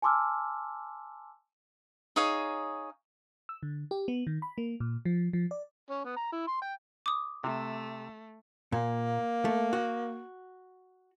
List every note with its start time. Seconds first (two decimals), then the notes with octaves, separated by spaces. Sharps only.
0.02 G#5 A5 C6 D6 E6 F6
2.16 D#4 G#4 C#5 F5
3.49 E6
3.63 D3
3.91 G4
4.08 B3
4.27 D#3
4.42 B5
4.58 A#3
4.80 A#2
5.05 F3
5.33 F3
5.51 D5
5.90 C#4
6.05 B3
6.16 A#5
6.32 E4
6.47 C6
6.62 G5
7.06 D6 D#6
7.44 C3 A3
8.72 A#2 A#3
9.45 A3
9.73 F#4